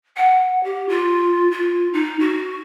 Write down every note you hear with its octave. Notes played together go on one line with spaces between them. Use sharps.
F#5
G4
F4
F4
D#4
F#4